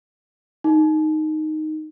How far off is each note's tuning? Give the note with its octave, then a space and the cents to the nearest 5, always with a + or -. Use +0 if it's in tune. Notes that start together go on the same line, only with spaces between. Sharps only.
D#4 -5